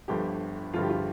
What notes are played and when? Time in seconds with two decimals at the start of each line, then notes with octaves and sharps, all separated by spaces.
0.08 G1 G2 D3 F3 G4
0.73 G1 G2 D3 F3 F4
0.83 G4
0.90 F4